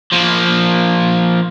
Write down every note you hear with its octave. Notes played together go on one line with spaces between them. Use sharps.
F3 A#3